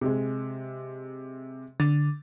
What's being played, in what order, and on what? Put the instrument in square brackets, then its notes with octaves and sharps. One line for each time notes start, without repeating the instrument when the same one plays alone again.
[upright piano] C3 G#3
[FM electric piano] D3 [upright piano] A6